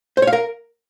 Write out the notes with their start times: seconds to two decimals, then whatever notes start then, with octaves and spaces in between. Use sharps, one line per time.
0.17 C5
0.22 C#5
0.27 F5
0.33 A#4